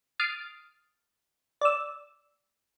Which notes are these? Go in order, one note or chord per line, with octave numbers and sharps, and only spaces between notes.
D#6 F6 A6 C7 D7
D5 E6